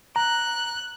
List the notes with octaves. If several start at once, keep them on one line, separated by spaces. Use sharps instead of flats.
A#5 F#6